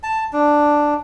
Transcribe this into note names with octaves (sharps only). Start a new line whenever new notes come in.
A5
D4